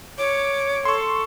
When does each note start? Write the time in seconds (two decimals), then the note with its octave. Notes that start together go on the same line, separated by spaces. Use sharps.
0.18 C#5 D6
0.85 A4 C6 C#6